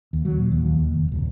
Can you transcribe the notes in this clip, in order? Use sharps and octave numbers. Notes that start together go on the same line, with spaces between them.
D#2
F#3
A#2
D#2
D#2
F1
D1